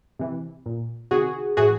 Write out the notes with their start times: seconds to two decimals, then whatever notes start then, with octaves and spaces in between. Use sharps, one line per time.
0.19 C3 E3
0.66 A#2
1.11 C3 D#3 F#4 G#4
1.57 A2 E3 F#4 G#4